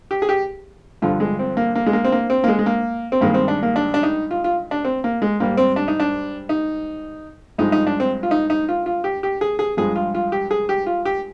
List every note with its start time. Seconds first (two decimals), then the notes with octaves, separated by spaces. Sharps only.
0.11 G4
0.22 G#4
0.29 G4
1.02 G2 D3 F3 F4
1.20 G#3
1.39 C4
1.57 A#3
1.75 A#3
1.86 G#3
1.93 A#3
2.05 C4
2.12 A#3
2.30 C4
2.44 A#3
2.48 G#3
2.59 G#3
2.66 A#3
3.12 C4
3.21 G2 D#3 G#3 A#3
3.34 C4
3.48 D4
3.63 A#3
3.76 D4
3.94 D4
4.03 D#4
4.31 F4
4.44 F4
4.71 D4
4.85 C4
5.04 A#3
5.22 G#3
5.40 G#2 G3 A#3
5.58 C4
5.76 D4
5.88 D#4
6.00 D4
6.49 D#4
7.58 G2 F3 G#3 D#4
7.72 D#4
7.87 D4
8.00 C4
8.23 F4
8.31 D#4
8.50 D#4
8.69 F4
8.86 F4
9.04 G4
9.23 G4
9.41 G#4
9.59 G#4
9.77 G2 F3 G#3 G#4
9.96 F4
10.15 F4
10.32 G4
10.51 G#4
10.69 G4
10.86 F4
11.05 G4